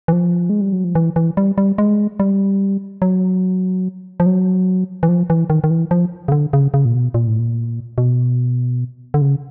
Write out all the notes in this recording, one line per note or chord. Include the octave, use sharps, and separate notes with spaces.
E3
F3
G#3
G3
F#3
F3
E3
E3
G3
G3
G#3
G3
F#3
F3
F#3
E3
F3
E3
D#3
D#3
E3
F3
C#3
D3
C#3
C#3
A#2
B2
A#2
A2
A#2
B2
D3
C#3